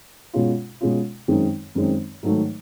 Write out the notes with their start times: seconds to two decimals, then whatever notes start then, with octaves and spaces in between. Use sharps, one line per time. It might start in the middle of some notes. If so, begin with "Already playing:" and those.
0.33 B2 G#3 C#4 F4
0.81 B2 G#3 C#4 F4
1.28 F#2 D#3 G#3 C4
1.75 F#2 D#3 G#3 C4
2.23 G#2 D#3 F#3 A3